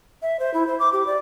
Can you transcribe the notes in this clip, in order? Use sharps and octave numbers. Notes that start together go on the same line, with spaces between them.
E5
C5
E4
C5
D6
G4
D5